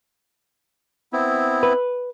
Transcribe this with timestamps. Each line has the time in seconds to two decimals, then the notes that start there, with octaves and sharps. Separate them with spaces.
1.13 B3 C4 E4
1.63 B4